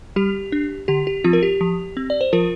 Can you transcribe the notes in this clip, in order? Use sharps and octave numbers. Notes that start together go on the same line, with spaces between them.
G3 G4
D4
D3 G4
G4
F3 C4 F4
A#4
G4
F3
C4
D5
C5
F3 F4 A#4